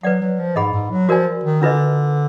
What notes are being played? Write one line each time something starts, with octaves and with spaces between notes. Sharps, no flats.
F#3 B4 D5 F#5
F#3
F3
G#2 G#4 D#5 F#5 B5
G#2
F#3
F3 F#4 A#4 D5 G#5
D#3
D3 D4 F4 B4 D#5